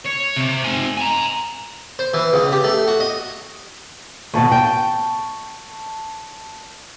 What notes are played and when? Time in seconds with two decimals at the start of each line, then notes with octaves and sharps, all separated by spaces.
0.05 C#5
0.36 C3
0.64 C4 G#5
0.98 G#5 A#5
1.99 C5
2.14 E3
2.33 C#2
2.52 G4
2.64 A3
2.88 F#4
3.00 D#5
4.34 D#2 B2 A5 C#6
4.52 G5